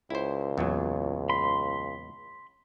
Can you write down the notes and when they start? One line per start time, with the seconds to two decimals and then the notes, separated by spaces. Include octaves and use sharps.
0.10 C#2 E4 C5
0.58 E2 A#2 F#3
1.30 B5 C6